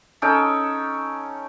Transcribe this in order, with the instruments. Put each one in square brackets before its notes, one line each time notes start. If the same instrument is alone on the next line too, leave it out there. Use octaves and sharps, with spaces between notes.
[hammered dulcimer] C#4 D#4 A4 G5